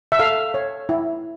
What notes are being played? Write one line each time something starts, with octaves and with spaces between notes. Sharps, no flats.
E5
A4 F5
C#5
E4